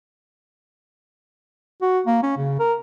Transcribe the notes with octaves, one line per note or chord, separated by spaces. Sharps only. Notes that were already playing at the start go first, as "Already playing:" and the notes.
F#4
A#3
C#4
C#3
A#4